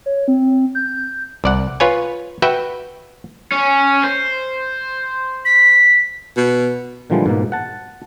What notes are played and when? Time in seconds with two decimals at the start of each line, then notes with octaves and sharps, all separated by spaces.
0.06 C#5
0.28 C4
0.75 G6
1.44 C2 D5 F#5
1.80 F4 B4 C#5 G#5
2.42 F#4 B4 E5 G5
3.52 C#4
4.04 C5
5.45 B6
6.37 B2
7.10 A#2 D3 E3 F3 G3 G#3
7.26 G#2 B2 A#3
7.52 F#5 A5